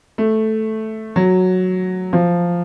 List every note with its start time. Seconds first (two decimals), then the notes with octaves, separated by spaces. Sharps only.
0.18 A3
1.16 F#3
2.13 F3